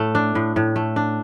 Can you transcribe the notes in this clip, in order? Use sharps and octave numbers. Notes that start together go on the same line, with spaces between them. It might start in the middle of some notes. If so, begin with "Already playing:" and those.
Already playing: A2 A3
D4
A2
A2
A3
D4